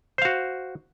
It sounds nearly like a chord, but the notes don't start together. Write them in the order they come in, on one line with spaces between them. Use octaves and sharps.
C5 F5 F#4